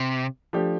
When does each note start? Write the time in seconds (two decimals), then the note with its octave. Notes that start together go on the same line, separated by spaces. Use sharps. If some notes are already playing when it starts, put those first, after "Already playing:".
Already playing: C3
0.53 F3 A3 D4 G4